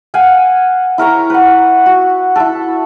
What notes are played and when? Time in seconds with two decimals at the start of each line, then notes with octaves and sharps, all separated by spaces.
0.14 F5 F#5 G#5
0.98 E4 A#4 C#5 A#5
1.30 B4 F#5
1.86 F#4
2.36 E4 A4